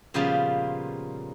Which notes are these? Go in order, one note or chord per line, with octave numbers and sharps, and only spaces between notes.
A#2 C#3 F3 G3 B3 F4